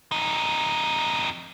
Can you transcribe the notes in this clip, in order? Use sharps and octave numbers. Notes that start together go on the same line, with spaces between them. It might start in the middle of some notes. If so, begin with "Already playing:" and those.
F2 D#4